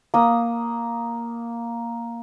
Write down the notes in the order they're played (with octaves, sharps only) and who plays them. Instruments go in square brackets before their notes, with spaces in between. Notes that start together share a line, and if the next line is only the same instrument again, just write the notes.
[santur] A#3 D#6